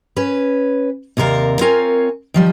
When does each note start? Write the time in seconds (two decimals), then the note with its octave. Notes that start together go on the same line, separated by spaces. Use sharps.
0.16 C#4 B4
1.17 D#2 C3 F4 A#4 D5 F5
1.61 C4 F4 A#4 C#5 G#5
2.34 D#3 F3 G3